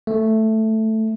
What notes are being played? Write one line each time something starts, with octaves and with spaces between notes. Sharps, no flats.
A3